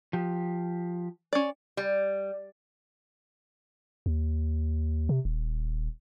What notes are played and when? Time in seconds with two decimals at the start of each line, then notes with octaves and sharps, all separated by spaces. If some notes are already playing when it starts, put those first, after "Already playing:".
0.13 F3 G4
1.33 C#4 D5
1.77 G3
4.06 D#2
5.09 C3
5.25 D#1